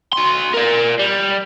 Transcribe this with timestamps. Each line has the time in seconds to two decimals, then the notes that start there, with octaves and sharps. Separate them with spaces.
0.13 F#4 C6
0.54 A#4 D5
0.99 G3